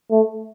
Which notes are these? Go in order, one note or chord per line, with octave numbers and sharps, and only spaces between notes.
A3